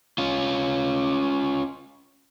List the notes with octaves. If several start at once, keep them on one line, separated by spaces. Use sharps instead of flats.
C#4 F4